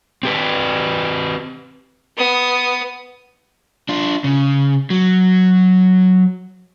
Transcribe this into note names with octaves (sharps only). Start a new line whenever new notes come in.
C4 G4 B4
B3 D#6
D4 F4
C#3
F#3